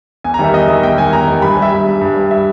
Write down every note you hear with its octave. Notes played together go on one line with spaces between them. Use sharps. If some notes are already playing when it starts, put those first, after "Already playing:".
E2 G#5
A#5
D#3 G3 E5
E2 D#5
D#3 G3 E5
E2 G5
D#3 G3 G#5
E2 A#5
D#3 G3
G2 B5
G#5
G3
E5
G2
G3
G2
G3
E5